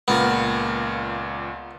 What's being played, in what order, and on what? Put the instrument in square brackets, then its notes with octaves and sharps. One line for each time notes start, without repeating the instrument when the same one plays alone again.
[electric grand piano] C#2 A#2 A#4 [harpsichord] B3